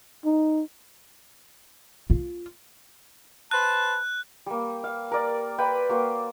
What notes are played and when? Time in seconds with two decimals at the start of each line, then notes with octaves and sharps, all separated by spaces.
0.25 D#4
2.10 F4
3.51 B4 C5 A5 F#6
4.46 G3 A#3
4.84 F5
5.12 A#4 D5
5.58 B4 G5 B5 C6
5.89 A#3 F#4 C5